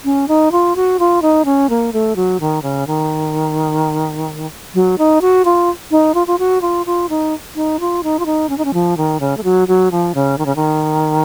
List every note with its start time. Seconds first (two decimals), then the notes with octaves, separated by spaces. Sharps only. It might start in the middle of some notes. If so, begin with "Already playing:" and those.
0.04 C#4
0.28 D#4
0.52 F4
0.76 F#4
0.99 F4
1.22 D#4
1.45 C#4
1.70 A#3
1.93 A3
2.16 F#3
2.40 D#3
2.63 C#3
2.87 D#3
4.75 F#3
4.98 D#4
5.21 F#4
5.45 F4
5.91 D#4
6.15 F4
6.27 F4
6.39 F#4
6.62 F4
6.86 F4
7.09 D#4
7.55 D#4
7.80 F4
8.03 D#4
8.19 F4
8.26 D#4
8.49 C#4
8.58 D#4
8.65 C#4
8.74 F3
8.97 D#3
9.20 C#3
9.37 A3
9.44 F#3
9.68 F#3
9.91 F3
10.15 C#3
10.38 D#3
10.46 C#3
10.56 D#3